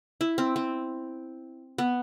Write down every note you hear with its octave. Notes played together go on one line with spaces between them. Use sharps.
E4
C4
C4
B3